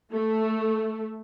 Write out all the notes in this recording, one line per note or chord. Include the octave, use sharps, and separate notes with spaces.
A3